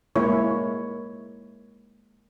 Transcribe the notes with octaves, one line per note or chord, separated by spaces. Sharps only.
G#3 A#3 E4 C#5